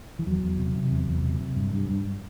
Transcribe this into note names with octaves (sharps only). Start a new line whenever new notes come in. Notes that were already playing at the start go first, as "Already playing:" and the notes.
E3
E2 F#3
E2
C3
C3
E2
E2
C3
C3
G2
G2
G2